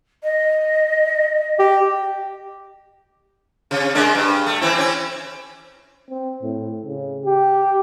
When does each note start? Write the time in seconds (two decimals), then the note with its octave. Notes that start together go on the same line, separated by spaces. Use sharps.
0.23 D#5
1.59 G4
3.71 C3
3.95 G#3 A#3 D4
4.15 G2
4.46 A3
4.61 E3 C4 E4
4.78 C4 C#4
6.10 C4
6.43 A2
6.86 C#3
7.25 G4